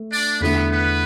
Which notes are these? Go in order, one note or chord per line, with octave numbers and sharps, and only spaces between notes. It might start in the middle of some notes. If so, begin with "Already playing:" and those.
Already playing: A3
D4 D5
E2 D3 A3 B3 E4 B4
B3 B4